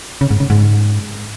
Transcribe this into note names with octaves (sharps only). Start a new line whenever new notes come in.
C#3
G#2
C#3
G#2